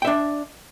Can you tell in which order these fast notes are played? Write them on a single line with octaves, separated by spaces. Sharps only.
G5 E5 D4